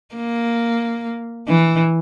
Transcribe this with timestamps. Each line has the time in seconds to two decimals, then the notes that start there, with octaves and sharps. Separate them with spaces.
0.15 A#3
1.47 E3